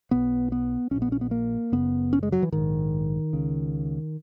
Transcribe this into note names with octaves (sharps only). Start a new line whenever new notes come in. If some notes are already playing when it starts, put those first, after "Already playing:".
B1 B2 B3
B3
A#1 A#2 C#4
B3
C#4
B3
A#3
F#1 F#2 C#3 B3
C#4
G#3
F#3
E3
A#1 G#2 D#3
C#2 C#3